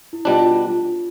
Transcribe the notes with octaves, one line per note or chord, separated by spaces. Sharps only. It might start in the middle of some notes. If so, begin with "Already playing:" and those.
E4
B2 G3 D4 F4
F4
F4